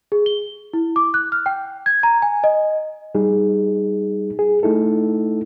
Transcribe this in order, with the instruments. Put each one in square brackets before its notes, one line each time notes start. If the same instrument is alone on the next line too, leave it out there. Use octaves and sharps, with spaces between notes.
[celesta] G#4
G7
E4
D6
F#6
F6
G5
G#6
A#5
G#5
D#5
[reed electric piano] G3 D#4 G#4
G#4
A3 D#4 E4 A4